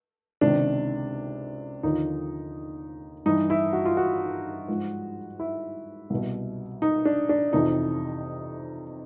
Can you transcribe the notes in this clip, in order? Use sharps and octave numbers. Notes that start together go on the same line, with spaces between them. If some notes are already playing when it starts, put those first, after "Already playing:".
C#2 C3 D#3 D4
D#2 D3 F3 D#4
G2 E3 D#4
E4
F#4
F4
F#4
G#2 F3
E4
C2 B2
D#4
D4
D4
F2 C3 E3 D#4